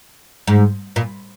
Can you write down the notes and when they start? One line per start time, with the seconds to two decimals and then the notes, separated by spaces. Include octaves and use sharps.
0.47 G#2
0.96 A#2